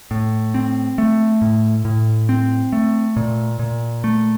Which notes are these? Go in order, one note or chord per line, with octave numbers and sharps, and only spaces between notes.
A2
C4
A3
A2
A2
C4
A3
A#2
A#2
A3